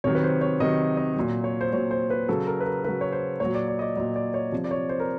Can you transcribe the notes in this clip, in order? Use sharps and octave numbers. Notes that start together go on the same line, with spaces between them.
C3 D#3 F#3 C#5
B4
C5
C#5
C3 D#3 F#3 D#5
D#5
A#2 F#3
C#5
C5
A#2 F#3 C#5
C5
B4
C#3 F#3 A4
A#4
B4
A#4
C#3 F#3 B4
C#5
C5
A#2 F#3 C#5
D5
D5
D#5
D5
A#2 F#3 D#5
D5
C#5
C3 F3
D5
C#5
C5
A#4